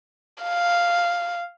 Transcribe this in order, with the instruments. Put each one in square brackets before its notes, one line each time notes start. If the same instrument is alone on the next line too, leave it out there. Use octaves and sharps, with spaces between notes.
[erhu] F5